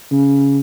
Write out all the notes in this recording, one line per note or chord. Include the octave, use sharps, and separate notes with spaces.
C#3